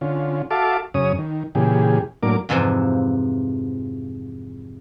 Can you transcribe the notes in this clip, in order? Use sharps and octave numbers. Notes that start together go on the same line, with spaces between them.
D3 C#4 F4
F#4 A4 E5 F5 A5 D6
F#2 C#3 C#4 C#5 D#6
D#3
A#2 C#3 E3 G4 G#4
A2 F#3 A#3 D4 A#4 D6
F2 G#2 C3 E3 F3